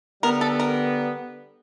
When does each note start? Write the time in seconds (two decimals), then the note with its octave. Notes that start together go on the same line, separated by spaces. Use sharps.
0.23 D3 G3 B3 A#4
0.41 A4
0.60 A#4